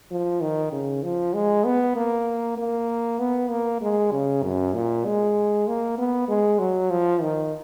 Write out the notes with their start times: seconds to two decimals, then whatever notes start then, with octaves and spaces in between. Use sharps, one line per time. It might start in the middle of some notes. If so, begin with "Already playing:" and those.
0.11 F3
0.41 D#3
0.72 C#3
1.03 F3
1.34 G#3
1.64 B3
1.96 A#3
2.58 A#3
3.19 B3
3.50 A#3
3.82 G#3
4.12 C#3
4.43 F#2
4.74 A#2
5.05 G#3
5.67 A#3
5.98 B3
6.28 G#3
6.59 F#3
6.90 F3
7.22 D#3